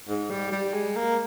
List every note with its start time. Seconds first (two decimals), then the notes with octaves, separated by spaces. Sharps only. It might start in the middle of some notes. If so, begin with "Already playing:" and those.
0.08 G#2
0.30 G3
0.52 G3
0.74 G#3
0.96 A#3